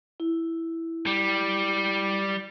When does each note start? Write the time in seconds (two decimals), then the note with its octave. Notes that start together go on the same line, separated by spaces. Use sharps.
0.20 E4
1.07 G3